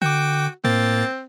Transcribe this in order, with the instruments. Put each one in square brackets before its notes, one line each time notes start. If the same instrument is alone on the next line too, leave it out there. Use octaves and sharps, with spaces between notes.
[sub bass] D3 [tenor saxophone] F#4 [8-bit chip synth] G5 D6
[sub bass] A2 [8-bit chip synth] A#3 A6 [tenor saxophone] C4